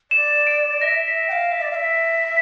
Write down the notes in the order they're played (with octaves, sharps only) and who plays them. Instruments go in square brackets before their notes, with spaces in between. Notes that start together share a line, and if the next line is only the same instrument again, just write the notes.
[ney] D5 [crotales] E7
[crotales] D7
[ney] E5 [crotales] A#6
[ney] E5
G5
F5
E5
D5
F5
E5